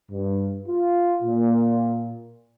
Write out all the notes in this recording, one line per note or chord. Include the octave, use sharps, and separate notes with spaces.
G2
F4
A#2